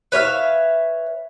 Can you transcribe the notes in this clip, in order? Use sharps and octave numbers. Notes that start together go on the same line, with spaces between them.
B4 C#5 E5 F5